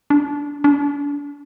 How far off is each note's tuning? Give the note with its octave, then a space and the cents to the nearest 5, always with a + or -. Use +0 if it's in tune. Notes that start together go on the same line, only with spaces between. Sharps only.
D4 -25
D4 -40